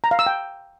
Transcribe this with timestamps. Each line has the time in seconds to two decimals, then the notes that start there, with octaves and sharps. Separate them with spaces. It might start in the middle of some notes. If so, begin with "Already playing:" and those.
0.04 A#5
0.11 F5
0.19 E6
0.26 G5